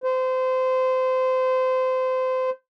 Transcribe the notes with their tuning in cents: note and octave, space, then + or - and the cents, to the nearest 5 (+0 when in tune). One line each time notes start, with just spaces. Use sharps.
C5 -25